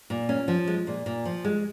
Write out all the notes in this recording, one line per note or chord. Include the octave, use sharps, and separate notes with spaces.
A#2
C#4
F3
G#3
A#2
A#2
F3
G#3